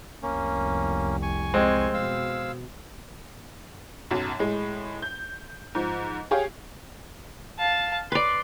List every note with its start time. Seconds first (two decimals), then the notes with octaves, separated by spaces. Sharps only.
0.23 F1 C2 A#3 C#4
1.22 G#5 C#6
1.54 G#3 C4
1.94 B2 F5 E6
4.11 B1 F#2
4.39 A2 G#3
5.02 G6
5.75 G#2 F3
6.31 G4 G#4 C#5 F5
7.59 F5 A5
8.12 B4 D5 C6